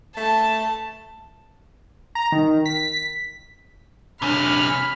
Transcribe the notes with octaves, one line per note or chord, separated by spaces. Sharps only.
A3 A5
A#5
D#3
B6
C3 C#4 D4 B5 F6